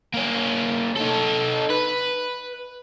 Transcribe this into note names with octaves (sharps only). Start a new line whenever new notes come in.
A#3 C#4
D#4 A4
B4